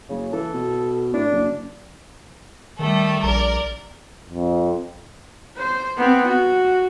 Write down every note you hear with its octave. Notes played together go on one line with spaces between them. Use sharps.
F#1 C#3
E3 A4
B2
A2 D4
F#1
D#3 G3 A3 A4
A#1 A#4 D5
F2
C5
B3 C4
F#4